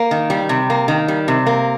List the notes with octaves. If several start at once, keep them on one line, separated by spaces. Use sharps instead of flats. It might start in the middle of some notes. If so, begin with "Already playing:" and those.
Already playing: A#3
D#3
G3
C3
A#3
D#3
G3
C3
A#3